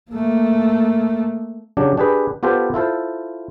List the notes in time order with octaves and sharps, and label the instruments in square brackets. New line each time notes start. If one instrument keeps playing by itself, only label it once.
[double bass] A3 A#3
[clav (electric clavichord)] C#3 F#3 D4 G4
D4 G4 G#4 B4
B3 F4 G4 A4 B4 C5
E4 F4 A4 C5